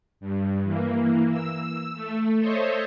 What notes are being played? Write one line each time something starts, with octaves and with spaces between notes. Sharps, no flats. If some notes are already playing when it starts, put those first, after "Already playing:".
G2
E3 A#3
E6
A3
A4 C5 C#5 D#5 E5